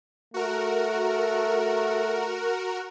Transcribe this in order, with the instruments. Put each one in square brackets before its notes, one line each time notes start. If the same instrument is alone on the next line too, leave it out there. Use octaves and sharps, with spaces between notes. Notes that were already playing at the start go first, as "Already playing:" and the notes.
[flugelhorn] A3 [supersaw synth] F#4 A#4